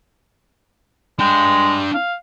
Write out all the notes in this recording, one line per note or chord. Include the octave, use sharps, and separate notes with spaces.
G#3 D4 G5
F5